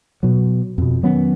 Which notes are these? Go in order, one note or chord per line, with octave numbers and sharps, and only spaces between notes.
B2 F#3
F2 B2
D#3 F#3 B3 C#4